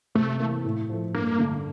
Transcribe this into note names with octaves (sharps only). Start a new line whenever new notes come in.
C3 A3
E3 A#3
A2
F3 A3
G2 A#3
D3 A3 D4